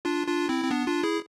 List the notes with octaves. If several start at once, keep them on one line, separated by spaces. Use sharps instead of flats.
D4 F4
D4 F4
C4 E4
C4
B3 D4
D4 F4
E4 G#4